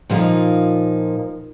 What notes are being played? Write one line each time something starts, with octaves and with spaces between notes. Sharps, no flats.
A#2 F3 A#3 D#4